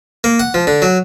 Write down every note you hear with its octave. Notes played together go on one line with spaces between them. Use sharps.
A#3
F#5
F3
D3
F#3